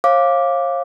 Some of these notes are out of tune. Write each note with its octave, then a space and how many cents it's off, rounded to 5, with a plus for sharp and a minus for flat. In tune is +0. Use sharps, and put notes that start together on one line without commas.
C#5 -40 F5 +0 D6 +0